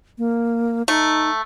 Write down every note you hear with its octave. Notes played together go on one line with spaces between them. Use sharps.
A#3
A3 D#4